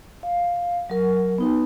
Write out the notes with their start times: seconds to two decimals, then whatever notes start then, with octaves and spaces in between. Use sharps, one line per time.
0.23 F5
0.90 F#3 A#4
1.38 B3 D#4 B4